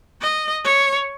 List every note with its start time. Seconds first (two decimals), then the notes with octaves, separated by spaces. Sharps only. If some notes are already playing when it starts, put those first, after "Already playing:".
0.21 D#5
0.64 C#5